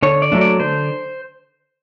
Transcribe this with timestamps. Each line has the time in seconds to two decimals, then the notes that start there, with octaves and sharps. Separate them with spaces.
0.03 D3 C#5
0.22 D5
0.32 F#3 A3 D4
0.41 D5
0.60 D3 C5